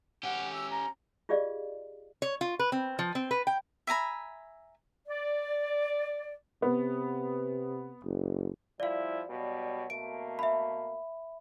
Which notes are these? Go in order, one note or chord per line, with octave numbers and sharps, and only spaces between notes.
C#4 G4 F#5
E6
A#5
F4 G4 G#4 D5 D#5 F5
C#5
F4
B4
C4
F3
C4
B4
G5
E5 G#5 A#5 B5
D5
C3 B3
F#1
F3 G3 E4 D5 F5
B2 F#3 G3
B2 A3 A#3 D7
E5 B5